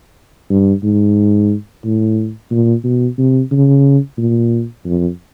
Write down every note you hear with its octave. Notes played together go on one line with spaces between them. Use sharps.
G2
G#2
A2
A#2
B2
C3
C#3
A#2
F2